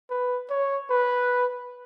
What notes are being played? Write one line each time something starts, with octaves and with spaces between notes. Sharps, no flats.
B4
C#5
B4